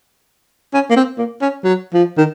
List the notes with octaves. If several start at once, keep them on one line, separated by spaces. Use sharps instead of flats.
C#4
A#3
C4
A#3
C#4
F#3
F3
D#3